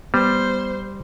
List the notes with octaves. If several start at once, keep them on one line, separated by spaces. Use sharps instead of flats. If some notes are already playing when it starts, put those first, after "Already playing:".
G3 B3 C5